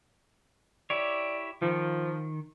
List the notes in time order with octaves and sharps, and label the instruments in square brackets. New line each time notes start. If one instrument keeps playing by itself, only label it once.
[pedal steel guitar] E4 G4 C#5 [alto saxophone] D5
[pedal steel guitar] D#3 [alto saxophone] F3